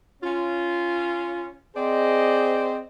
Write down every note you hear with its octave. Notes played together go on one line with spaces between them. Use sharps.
C#4 F4
C4 G#4 C5 D5 D#5